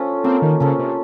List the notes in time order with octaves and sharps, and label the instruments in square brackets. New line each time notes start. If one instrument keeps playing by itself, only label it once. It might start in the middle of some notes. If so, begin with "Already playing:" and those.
Already playing: [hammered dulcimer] C#4 F4 A4
[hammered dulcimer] A#3 [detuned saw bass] C4
[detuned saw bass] D#3
[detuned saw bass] C#3 [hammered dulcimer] C#4 F4 A4
[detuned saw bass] C3